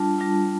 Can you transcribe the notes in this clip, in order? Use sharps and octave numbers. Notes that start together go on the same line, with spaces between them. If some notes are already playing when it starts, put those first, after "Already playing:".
Already playing: G3 D4 F4 A5
G3 D4 F4